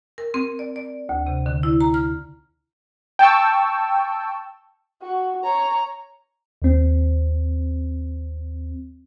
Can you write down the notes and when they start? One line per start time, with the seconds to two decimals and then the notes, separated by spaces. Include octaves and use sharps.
0.18 A#4
0.34 C4
0.59 D5
0.76 D5
1.09 D2
1.27 C3
1.46 D3
1.63 E4
1.81 A#5
1.94 F6
3.19 G5 A5 C#6 E6
5.02 F#4
5.43 C#5 A#5
6.62 D#2 C4